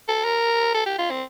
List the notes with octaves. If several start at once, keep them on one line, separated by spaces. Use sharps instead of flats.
A4
A#4
A4
G4
F4
C4